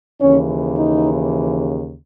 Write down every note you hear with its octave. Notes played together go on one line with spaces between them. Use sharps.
D#2 C#3 E3 C#4
D#4